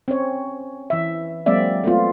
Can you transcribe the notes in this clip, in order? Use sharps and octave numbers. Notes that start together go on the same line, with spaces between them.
C4 C#4 C#5
E3 E5
F#3 G#3 A#3 C4 D5 E5
A3 B3 C4 F4